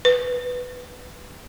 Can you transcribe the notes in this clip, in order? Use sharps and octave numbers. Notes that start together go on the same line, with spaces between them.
B4